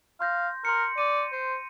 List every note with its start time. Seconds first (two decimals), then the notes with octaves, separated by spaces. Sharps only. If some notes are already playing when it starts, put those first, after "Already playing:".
0.20 F5 C6 G6 A#6
0.65 A#4 C6 C#7
0.98 D5 D#7
1.32 C5